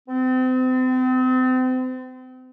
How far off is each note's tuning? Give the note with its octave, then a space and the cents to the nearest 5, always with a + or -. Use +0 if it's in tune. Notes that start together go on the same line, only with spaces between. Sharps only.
C4 -35